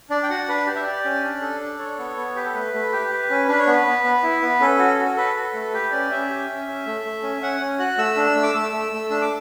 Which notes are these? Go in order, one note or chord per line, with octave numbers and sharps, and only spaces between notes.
D4 D5
G5
F#4 F#5
D4 B4
G4 D5
E5
G4 D5
C#4
D4
A4
D4
A4 C#5
B3
B3
G4 B4
A4
A3 B4
A3
G4
G4
C#4
D4 B4
C#5
B3 B4
B3
B3
E4
B3
C#4 A4
F#4
F#4
A4
A4 B4
A4
A3
A4
G4 B4
C#4 D5
C#4 E5
G4
C#4
C#4
A3
A3
C#4
C#4 F#5
C#4
F#4 F#6
A3 E6
D4
A3
D6
A3 E6
A3
A3
D4 E6
D6